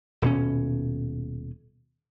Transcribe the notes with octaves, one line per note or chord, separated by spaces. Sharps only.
D#1 B2 C#4